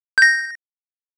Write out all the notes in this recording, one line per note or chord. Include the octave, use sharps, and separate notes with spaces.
G6 A#6